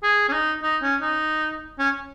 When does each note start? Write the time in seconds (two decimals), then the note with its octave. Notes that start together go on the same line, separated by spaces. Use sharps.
0.03 G#4
0.29 C#4
0.33 D#4
0.63 D#4
0.82 C#4
1.01 D#4
1.79 C#4